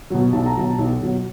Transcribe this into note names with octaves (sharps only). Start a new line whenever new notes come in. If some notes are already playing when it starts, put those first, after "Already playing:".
B2 F#3
B1 A5
A#5
B2 F#3 A5
B1
B2 F#3